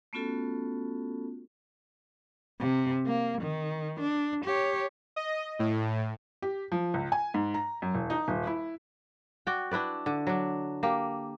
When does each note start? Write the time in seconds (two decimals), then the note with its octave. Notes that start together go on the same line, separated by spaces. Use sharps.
0.13 A3 B3 C#4 F4 F#4 A4
2.60 C3
3.06 A#3
3.42 D#3
4.01 D4
4.45 G4 C#5
5.16 D#5
5.59 A2
6.42 G4
6.72 F3
6.94 C#2
7.12 G#5
7.34 G#2
7.54 A#5
7.82 F#2
7.94 E1
8.10 D#4
8.28 D#1
8.47 E4
9.47 F#4 D5 G5
9.71 D4 E4 B4 D5
10.06 D3
10.27 F#3 D4
10.83 A#3 G4